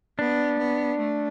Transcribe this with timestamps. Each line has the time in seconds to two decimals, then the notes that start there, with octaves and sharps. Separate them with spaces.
0.19 B3 D4
0.59 B3
1.00 A3